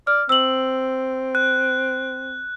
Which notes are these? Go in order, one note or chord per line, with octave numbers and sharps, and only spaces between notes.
D5 F6
C4 E6 F#7
F#6